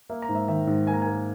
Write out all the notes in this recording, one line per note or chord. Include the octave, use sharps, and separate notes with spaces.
A#3 E5
A#5
G#2
E5
D#3 E5
G#2
A#3 G#5
A#5
A#3 G#5